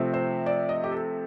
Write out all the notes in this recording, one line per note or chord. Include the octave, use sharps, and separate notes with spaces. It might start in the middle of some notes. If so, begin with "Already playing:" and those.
Already playing: C3 F3 A3 C4
C5
D5
D#5
G4
A4